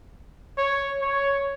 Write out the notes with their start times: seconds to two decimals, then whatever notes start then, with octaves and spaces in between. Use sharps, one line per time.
0.58 C#5
1.02 C#5